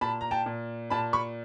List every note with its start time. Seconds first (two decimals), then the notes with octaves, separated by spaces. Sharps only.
0.01 A#2 A5 B5
0.21 A#5
0.31 G5 A5
0.46 A#2
0.90 A#2 A5 B5
1.13 B5 C#6